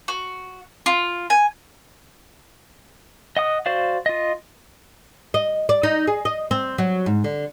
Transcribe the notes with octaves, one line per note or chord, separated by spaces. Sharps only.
F#4
F4
G#5
D#5 F#5 D#6
F#4 C5 D5 F5
F4 D#5
D#5
D5
D#4
G#4
D#5
C4
F#3
G#2
D3